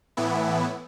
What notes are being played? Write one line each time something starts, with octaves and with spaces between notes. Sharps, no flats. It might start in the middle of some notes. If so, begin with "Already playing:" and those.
A2 E3 B3 E4